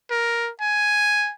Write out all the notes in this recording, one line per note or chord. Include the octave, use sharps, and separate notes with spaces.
A#4
G#5